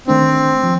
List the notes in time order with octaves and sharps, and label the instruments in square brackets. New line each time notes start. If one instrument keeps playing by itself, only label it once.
[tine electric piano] D#3 A3 D4 [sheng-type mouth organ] C4
[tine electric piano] F3